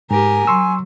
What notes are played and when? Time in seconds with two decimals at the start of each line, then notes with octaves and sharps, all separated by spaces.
0.11 G#2 G4 A#4 G#5
0.47 F#3 C6 C#6 E6